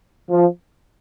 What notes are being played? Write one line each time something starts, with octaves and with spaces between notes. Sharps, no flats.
F3